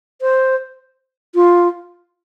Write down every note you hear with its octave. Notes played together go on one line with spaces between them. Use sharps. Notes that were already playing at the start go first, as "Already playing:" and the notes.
C5
F4